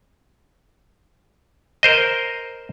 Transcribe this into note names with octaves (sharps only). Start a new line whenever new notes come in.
A#4 C5 D#5